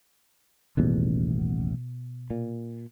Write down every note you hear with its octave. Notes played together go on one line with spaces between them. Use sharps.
D#1 A1 E2 B2
A#2